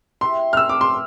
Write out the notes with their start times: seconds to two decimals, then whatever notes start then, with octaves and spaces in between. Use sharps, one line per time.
0.21 E4 G4 C5 E5 C6
0.53 F6
0.57 E6
0.69 D6
0.81 C6